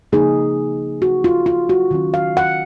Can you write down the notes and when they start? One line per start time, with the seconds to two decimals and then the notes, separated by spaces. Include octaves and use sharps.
0.13 C#3 F3 A#3 D#4 G#4
1.02 F#4
1.24 F4
1.46 F4
1.69 F#4
1.91 D#3 F#3 C#4
2.14 F5
2.37 F#5